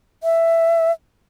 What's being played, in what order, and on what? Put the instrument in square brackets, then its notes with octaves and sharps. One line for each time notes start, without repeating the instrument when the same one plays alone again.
[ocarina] E5